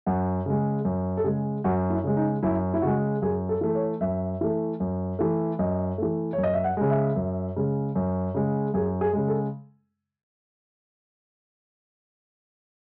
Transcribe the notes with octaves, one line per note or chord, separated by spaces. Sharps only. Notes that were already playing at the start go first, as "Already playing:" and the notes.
F#2 F#5
C#3 G#3
F#2
A4
C#3 G#3 G#4
F#2 F#4
E4
C#3 G#3
D#4
F#2 E4
E4
C#3 G#3 F#4
F#2 G#4
A4
E3 A3
C#5
F#2 E5
E3 A3
F#2
E3 A3
F#2 D#5
E3 A3
C#5
F#2
D#5
E5
F#5
C#3 G#3
E5
F#2
C#3 G#3
F#2
C#3 G#3
F#2 G#4
G#4
C#3 G#3
A4